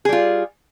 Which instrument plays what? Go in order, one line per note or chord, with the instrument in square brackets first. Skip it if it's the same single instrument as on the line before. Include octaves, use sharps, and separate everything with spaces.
[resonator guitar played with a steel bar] G#4
G3
F4